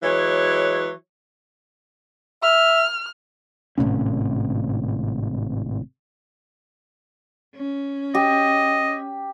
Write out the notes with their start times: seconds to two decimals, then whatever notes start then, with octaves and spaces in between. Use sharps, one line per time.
0.03 E3 F#3 G#3 C#5
2.43 E5 F6
3.78 G#1 A2 C3 C#4
7.55 C#4
8.15 G4 D#5